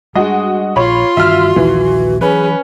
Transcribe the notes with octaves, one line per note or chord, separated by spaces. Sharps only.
G3 G#3 B3 D4 F#4 D#5
A#1 F4 C#5 B5 C6
G2 D#3 E3 F#4 E5 F6
A#1 D#2 E3
E3 F#3 C#4 G#4 B4